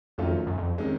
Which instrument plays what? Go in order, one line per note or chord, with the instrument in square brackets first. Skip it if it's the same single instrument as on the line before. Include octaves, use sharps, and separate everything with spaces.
[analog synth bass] F2 [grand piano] D#3 F#3 A3 C#4 F4
[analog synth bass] F#2
F2
[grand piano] C3 D#3 G#3 C#4